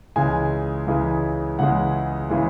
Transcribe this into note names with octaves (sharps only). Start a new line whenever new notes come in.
C#2 C#3 E3 G#3 G#5
C#2 C#3 E3 G#3
C#2 C#3 E3 G#3 F#5
C#3 E3 G#3